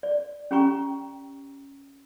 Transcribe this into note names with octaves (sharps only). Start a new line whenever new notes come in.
D5
C#4 G4 G5 A#5 C#6